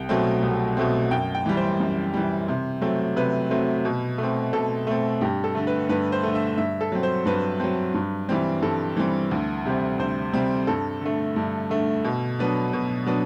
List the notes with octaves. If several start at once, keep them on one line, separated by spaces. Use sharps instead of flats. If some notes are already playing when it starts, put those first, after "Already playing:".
Already playing: C2 G5
B2 F#3 A3 C4
C2
B2 F#3 A3 C4
F#2 G5
G5
E3 G3
C5
F#2
E3 G3
C3
F#3 A3 C4
C3 B4
F#3 A3 C4
B2
A3
C4
B2 A4
A3 C4
G2 G4
A4
D3 A3
B4
G2 B4
C5
D3 A3
E5
G2 E5
A4
F#3 C4
C5
G2 B4
F#3 C4
G2
E3 G3 C4
G2 A4
E3 G3 C4
D2
C3 G3 C4
D2 C5
C3 G3 C4
G2 A4
D3 A3
G2
D3 A3
B2
F#3 B3 D4
B2
F#3 B3 D4